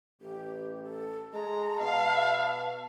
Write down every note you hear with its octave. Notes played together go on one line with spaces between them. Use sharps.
A1 G4
A4
G#3 A5 A#5
B2 F5